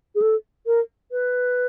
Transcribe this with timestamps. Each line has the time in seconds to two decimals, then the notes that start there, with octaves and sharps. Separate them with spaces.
0.15 G#4
0.21 A4
0.66 A#4
1.11 B4